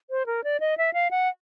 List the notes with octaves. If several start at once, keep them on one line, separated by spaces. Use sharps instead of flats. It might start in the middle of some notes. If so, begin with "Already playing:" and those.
C5
A#4
D5
D#5
E5
F5
F#5